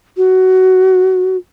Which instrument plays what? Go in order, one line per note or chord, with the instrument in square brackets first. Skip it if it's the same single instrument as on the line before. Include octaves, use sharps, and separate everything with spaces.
[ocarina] F#4